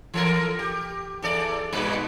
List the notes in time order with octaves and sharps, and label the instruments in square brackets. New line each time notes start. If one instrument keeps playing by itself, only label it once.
[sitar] E3 A4 A#4
G4
E2 A4 D5
G2 A#2 B4